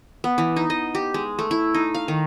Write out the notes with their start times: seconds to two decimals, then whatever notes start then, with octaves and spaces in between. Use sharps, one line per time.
0.24 B3
0.38 E3
0.56 D#4
0.70 D#5
0.95 G4
1.14 G#3
1.39 A3
1.51 E4
1.74 D#4
1.94 F5
2.08 D#3